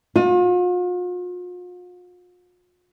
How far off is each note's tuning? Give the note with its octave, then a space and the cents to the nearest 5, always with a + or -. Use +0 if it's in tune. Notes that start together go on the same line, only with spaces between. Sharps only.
F4 +45